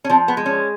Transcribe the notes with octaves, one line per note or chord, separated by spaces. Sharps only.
C#4
F3 C4
B3
G#3
C#4